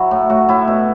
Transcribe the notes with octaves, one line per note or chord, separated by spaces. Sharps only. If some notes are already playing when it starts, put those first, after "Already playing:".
Already playing: F#3 E4 F#4
A2
A2 F#4
A2 E4
B2